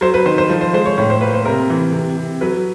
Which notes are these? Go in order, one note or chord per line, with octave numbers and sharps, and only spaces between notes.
F#3 C5
B4
D#3 C5
C5
F3
C5
G#3 C5
C#5
A2 C#5
C5
A#3 B4
C5
C3 A#4
E3
C3
C3
F#3 B4